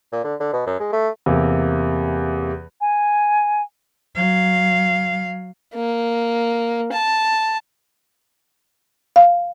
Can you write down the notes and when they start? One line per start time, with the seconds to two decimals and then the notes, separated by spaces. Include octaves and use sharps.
0.12 A#2
0.24 D3
0.40 D3
0.53 B2
0.67 F#2
0.80 G#3
0.92 A3
1.26 E2 C3 A#3
2.81 G#5
4.16 F#3 F5
5.74 A#3
6.92 A5
9.16 F5